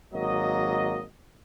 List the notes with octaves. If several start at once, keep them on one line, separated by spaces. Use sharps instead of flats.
G#1 F#3 A#3 D#5